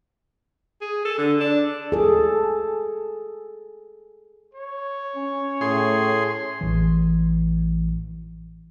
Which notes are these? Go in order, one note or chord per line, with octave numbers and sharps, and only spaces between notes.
G#4
A4
D3
D4
G#4 A4
C#5
C#4
A2 G#4 C6
A1 E3